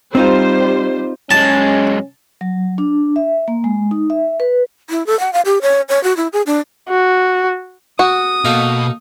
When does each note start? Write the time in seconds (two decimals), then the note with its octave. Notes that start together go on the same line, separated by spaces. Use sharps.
0.15 G3 C4 D#4 F4 C5
1.31 F#2 G#3 C#4 A5
2.41 F#3
2.78 D4
3.16 E5
3.48 A#3
3.64 G#3
3.91 D#4
4.10 E5
4.40 B4
4.90 E4
5.06 A4
5.19 F#5
5.33 F5
5.45 G4
5.62 C#5
5.89 C#5
6.03 F#4
6.17 E4
6.33 G#4
6.46 D4
6.89 F#4
7.99 F#4 D#6
8.45 B2 A#3 D#4 A4